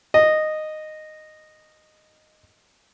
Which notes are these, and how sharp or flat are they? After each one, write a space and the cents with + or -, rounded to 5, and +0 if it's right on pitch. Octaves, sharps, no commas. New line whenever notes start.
D#5 -10